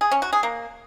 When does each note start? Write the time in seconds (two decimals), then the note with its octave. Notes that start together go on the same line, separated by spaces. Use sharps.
0.01 G#4
0.11 C#4
0.22 F#4
0.33 G#4
0.43 A#3